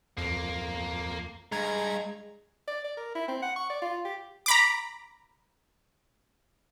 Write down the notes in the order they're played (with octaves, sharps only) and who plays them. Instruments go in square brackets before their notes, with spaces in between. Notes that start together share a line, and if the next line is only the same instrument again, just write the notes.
[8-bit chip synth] F2 [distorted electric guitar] A#3
[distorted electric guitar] G2 [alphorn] G#3 [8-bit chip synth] A#5 G#6
[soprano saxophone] D5
D5
A#4
E4
C4
F#5
C#6
D5
F4
G4
[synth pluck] A#5 B5 D6